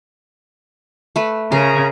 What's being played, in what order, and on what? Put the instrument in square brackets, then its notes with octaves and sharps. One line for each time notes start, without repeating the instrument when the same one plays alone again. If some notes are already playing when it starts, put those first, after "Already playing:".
[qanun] A3 B4
[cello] C#3 [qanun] G#4 [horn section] A#4 A#5